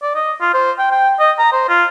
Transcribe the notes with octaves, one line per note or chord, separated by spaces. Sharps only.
D5
D#5
F4
C5
G5
G5
D#5
A#5
C5
F4